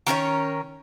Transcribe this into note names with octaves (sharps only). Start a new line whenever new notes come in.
D#3 C#4 A#4 C#5